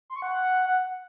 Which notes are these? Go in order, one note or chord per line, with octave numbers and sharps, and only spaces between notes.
C6
C#6
F#5